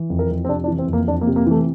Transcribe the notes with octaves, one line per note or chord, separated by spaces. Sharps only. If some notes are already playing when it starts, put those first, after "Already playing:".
Already playing: E3
F2
A#4
F2
C4
C3 D4
D4
E3
C4
F2
A#3
F2 D4
A#3
C3
A#3
E3 A3